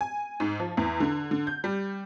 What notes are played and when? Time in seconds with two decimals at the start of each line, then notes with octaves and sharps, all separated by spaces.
0.01 G#5
0.40 G#2
0.60 F3
0.77 E2
1.00 D3
1.31 D3
1.47 G6
1.64 G3